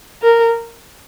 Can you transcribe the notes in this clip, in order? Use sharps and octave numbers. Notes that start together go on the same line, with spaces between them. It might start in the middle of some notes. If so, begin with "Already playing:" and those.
A#4